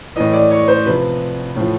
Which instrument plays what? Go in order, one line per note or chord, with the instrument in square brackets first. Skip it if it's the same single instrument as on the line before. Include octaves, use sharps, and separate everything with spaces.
[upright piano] A2 E3 D#5
D5
C#5
C5
C3 F3 B4
A2 F3